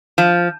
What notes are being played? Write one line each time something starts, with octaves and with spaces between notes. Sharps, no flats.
F3